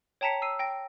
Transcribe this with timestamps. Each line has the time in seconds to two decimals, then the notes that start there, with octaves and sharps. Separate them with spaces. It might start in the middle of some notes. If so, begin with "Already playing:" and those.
0.21 C#5 G5 A5 A#5 B6 C#7
0.42 E6 C7 D#7
0.59 G5 A#6 D7